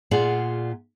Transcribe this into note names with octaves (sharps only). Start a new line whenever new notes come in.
A#2 F4 G#4 D5 F#5